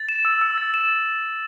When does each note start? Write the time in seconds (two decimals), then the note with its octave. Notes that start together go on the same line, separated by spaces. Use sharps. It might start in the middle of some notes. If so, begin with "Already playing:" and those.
Already playing: A6
0.09 E7
0.25 E6
0.41 E6
0.58 A6
0.74 E7